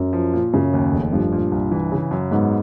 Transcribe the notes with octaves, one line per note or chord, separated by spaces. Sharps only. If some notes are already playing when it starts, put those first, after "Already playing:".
Already playing: F#2
F3
A#2
F#2 C#3
D#2
F1
G2 F3
A#2
C2
E3
C#3
F#2
G#2 B3